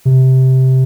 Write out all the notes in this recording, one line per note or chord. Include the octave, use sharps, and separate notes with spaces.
C3